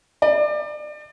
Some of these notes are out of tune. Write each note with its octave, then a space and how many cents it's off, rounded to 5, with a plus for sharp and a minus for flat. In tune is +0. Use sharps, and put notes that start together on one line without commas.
D5 +30